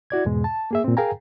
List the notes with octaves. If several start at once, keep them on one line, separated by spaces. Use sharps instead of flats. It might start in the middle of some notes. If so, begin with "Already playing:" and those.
E4 F#4 D5 G#6
E2 G#2 B2 G#3
A5
A#3 G#4 E5
A#2 C4
G#4 A#4 F5 G5 G#5 A#5